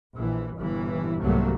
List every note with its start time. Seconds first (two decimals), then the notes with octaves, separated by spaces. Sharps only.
0.15 A#1 E3
0.57 G1 G2 A#2 E3
1.20 C2 G#2 C3 F#3 A3 A#3